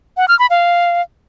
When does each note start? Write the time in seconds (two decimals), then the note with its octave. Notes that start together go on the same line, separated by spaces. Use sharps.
0.17 F#5
0.28 F6
0.39 B5
0.50 F5